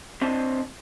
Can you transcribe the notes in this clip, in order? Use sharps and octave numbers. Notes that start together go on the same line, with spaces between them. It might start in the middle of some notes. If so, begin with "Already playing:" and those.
C4 D4 C5 D#5 A5